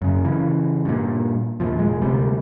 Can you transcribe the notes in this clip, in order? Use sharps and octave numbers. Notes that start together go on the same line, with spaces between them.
F#2 C#3
C#3 E3
G2 A#2
D#2 A#2 F3
F1 G#3
D2 C3 G3 B3